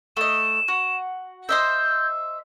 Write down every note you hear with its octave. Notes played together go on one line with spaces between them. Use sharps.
A3 D#5 E7
F#4
C5 D#5 E5 G6